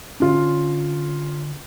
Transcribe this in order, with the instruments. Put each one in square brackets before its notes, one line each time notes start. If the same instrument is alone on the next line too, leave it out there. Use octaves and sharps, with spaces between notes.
[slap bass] D3 D4 [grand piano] C#4 F4